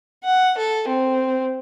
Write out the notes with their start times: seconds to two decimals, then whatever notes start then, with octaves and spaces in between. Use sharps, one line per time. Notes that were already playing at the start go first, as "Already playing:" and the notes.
0.24 F#5
0.57 A4
0.88 C4